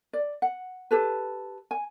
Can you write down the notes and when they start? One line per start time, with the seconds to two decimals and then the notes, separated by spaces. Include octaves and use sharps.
0.13 D5
0.42 F#5
0.91 G4 A4 B4
1.71 G#5